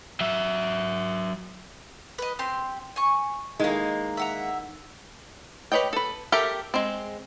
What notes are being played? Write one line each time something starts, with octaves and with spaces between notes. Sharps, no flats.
F#3 E5
B4 D#5
C4 G4 C6
G#5 C#6
D#3 G#3 A#3 E4
E5 F#5 A#5
G4 B4 C#5 D#5 G5
A4 B4
G4 A4 A#4 E5 G5
G#3 C4